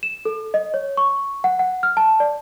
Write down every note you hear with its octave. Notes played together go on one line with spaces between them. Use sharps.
E7
A4
D#5
C#5
C#6
F#5
F#5
F6
A5
D5